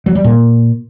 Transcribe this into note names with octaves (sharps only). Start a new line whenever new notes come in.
F#3
G3
A#2